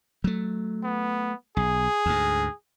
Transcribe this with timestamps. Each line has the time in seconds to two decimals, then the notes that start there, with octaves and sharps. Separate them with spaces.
0.24 F#3 A3
0.84 B3
1.57 B1 G#4
2.06 D2 G#2